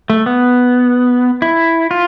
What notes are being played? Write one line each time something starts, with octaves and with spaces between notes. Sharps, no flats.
A3
B3
E4
F4